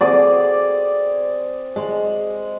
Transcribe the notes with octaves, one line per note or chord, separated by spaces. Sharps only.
C4 G#4 D5
G#3